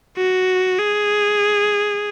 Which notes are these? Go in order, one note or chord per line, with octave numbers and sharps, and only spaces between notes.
F#4
G#4